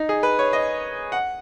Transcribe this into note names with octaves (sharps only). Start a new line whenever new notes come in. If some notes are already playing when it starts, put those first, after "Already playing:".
Already playing: D#4
G#4
B4
C#5
D#5
F#5